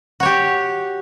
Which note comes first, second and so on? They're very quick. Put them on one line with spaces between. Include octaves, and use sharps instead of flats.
F#4 C#5 G4